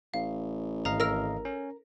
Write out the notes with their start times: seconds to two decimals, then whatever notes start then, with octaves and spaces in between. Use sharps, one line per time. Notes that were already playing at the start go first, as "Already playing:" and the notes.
0.14 A1 F5
0.85 G#1 D#5 F5 A#5
1.00 A#4 A#5 E6 F6
1.45 C#4